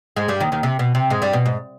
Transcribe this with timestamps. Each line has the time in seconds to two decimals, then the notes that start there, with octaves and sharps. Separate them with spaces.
0.16 G#2 G#3
0.28 G2 G3
0.40 D#2 D#3
0.52 D#2 D#3
0.63 C3
0.79 B2
0.95 C3
1.10 G#2 G#3
1.22 G2 G3
1.33 B2
1.46 G#2